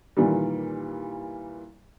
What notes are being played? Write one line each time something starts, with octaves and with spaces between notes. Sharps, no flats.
A#2 D#3 E3 G3